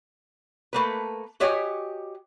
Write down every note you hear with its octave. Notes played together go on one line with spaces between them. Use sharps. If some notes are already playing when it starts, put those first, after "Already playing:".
A3 A#3 B4
F#4 G4 C#5 D#5 G5 G#5